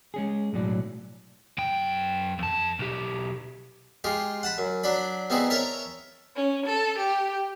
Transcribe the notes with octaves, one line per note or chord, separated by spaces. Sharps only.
G#3 C#4 G#4
B1 A2 F#3 D5
F#2 G5
F2 A5
B1 G4
G#3 F4 G4
F#5 A5 B5
F#2
F#3 D4 D5 B5
G3 B3 C4 D#4 E4 G#4
A#4 C#5 E5 A5 C#6
C#4
A4
G4